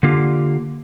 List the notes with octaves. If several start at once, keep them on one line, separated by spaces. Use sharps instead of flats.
D3 A#3 F4 G4